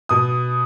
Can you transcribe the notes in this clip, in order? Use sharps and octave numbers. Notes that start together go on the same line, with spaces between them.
B2 D#6